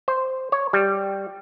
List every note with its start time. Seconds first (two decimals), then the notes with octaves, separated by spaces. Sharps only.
0.08 C5
0.52 C#5
0.73 G3